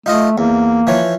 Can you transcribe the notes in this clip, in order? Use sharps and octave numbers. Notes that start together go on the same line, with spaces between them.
A3 D#4 F4 D#5
E2 A#3
E3 F3 C#5